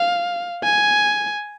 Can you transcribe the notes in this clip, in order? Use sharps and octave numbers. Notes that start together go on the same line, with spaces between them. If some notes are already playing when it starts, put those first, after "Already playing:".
Already playing: F5
G#5